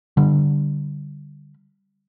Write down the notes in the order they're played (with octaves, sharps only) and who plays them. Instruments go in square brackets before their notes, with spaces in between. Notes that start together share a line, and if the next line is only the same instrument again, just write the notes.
[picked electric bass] D3 G3